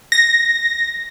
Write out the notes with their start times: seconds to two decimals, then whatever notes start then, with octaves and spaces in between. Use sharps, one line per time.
0.12 A#6